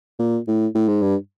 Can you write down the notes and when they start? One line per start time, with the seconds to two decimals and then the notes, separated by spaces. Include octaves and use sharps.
0.19 A#2
0.48 A2
0.75 A2
0.88 G#2
1.02 G2